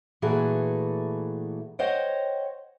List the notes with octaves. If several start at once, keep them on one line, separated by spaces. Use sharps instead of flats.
A#2 E3 A3 F#4 G#4 A4
C5 C#5 D#5 F#5 G5